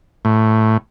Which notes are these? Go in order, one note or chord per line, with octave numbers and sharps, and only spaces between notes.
A2